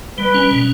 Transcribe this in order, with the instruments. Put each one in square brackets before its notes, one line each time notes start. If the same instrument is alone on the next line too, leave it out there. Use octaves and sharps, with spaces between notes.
[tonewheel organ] G3 [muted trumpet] B4
[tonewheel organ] C#4
B2